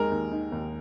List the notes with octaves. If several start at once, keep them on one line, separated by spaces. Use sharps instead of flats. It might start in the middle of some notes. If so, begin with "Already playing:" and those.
Already playing: D#2 D#3 G#3 A#4
D#2
D#3
D#2